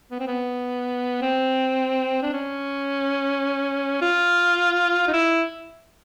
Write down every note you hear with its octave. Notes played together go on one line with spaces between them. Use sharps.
B3
C4
B3
C4
D4
C#4
F4
D#4
E4